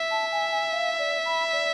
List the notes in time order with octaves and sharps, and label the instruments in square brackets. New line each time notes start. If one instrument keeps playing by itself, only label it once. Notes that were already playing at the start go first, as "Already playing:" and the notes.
Already playing: [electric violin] E5
[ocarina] A5
G#5
G#5
F5
D5
B5
D5